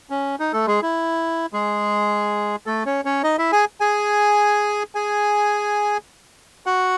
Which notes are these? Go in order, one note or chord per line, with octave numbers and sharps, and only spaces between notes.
C#4
D#4
A3 A4
G#3 G#4
E4
G#3 G#4
A3 A4
C#4 C#5
C#4 C#5
D#4 D#5
E4 E5
G#4 G#5
G#4 G#5
G#4 G#5
F#4 F#5